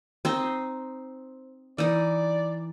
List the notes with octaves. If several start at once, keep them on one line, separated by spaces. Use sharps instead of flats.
C4 D#4 C5
E3 D#4 D5